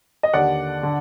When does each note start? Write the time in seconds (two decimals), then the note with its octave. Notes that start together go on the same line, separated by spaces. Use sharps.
0.23 D#5
0.33 D#2 D3 D5 F#5
0.83 D3